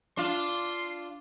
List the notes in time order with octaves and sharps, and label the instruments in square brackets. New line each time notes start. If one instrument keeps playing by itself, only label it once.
[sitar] D4 F4 [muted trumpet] C6